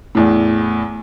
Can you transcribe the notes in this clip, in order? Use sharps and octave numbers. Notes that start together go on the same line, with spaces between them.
E2 A2